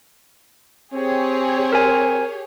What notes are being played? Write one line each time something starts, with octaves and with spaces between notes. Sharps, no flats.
C4 G4 G#4 C#5
A#4 G#5